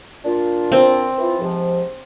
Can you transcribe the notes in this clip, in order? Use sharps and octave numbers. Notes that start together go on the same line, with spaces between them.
A#2 D4 F4
C4
E3 F4
G#2 C3 F3